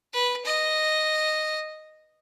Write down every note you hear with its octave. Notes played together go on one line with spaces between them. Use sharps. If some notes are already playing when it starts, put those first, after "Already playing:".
B4
D#5